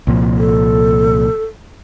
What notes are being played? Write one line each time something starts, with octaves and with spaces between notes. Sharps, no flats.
C2 A#2 F3
A4